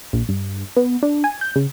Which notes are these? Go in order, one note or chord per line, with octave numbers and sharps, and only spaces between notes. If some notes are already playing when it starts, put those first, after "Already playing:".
A#1
G2
B3
D4
G#5
G6
C#3